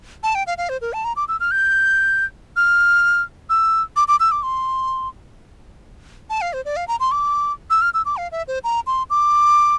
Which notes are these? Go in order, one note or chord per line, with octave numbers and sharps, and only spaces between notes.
A5
G5
F5
F5
C5
A#4
A5
A#5
D6
E6
F6
G6
F6
E6
D6
D6
E6
D6
C6
A5
F5
C5
D5
F5
A#5
C6
D6
E6
F6
E6
D6
F5
E5
C5
A#5
C6
D6